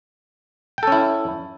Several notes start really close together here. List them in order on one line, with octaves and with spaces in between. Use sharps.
G5 A4 C#4 E4